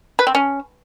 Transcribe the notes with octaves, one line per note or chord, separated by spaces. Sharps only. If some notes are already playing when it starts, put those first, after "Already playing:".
B4
C4
C#4